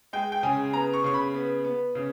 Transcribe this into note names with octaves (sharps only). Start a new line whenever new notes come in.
G#3 G5
G5
C#3 G#5
B3 A#5
C#6
C#3 C#6
B5
B3
B3
C#3